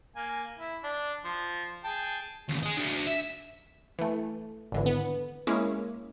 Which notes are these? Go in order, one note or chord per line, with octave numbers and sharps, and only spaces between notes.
A#3 G#5
E4
D4
F3
G#4 G5 A5
D#2 C#3
G#4 D#5
D4 F#4
E5
E3 A3
G#1 D3 E3
B3
G#3 A#3 C#4 E4 G#4